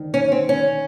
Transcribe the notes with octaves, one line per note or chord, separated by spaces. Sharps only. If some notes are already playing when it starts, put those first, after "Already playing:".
Already playing: D2 D#3
C#4
C4
C#4